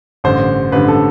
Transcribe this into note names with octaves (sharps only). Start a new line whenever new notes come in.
A1 G2 D3 C5
A1 G2 D3 B4
A4